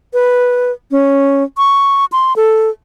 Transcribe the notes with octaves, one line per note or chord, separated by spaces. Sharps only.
B4
C#4
C#6
C6
A4